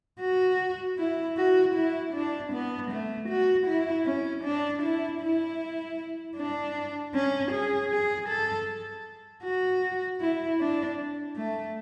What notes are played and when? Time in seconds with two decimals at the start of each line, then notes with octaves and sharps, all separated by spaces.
0.20 F#4
0.98 E4
1.37 F#4
1.75 E4
2.14 D4
2.52 B3
2.91 A3
3.29 F#4
3.67 E4
4.06 C#4
4.44 D4
4.82 E4
5.21 E4
6.37 D4
7.14 C#4
7.52 G#4
7.91 G#4
8.29 A4
9.44 F#4
10.21 E4
10.60 D4
11.36 A3